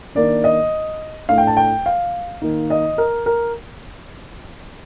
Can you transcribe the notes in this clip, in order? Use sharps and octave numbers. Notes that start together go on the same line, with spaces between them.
D#3 A#3 D4 D5
D#5
A2 A3 D4 F5
G5
A5
G5
F5
D#3 A#3 D#4
D#5
A#4
A#4